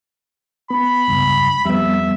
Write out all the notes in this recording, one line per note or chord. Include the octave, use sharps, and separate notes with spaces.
B3 B5
F1 C#2 G2
F2 G3 B3 E5